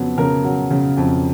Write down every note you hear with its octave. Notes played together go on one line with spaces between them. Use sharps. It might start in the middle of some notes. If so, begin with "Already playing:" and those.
Already playing: F2 C#3 F#3 B3
C#3 A#4
F#3
C#3
F2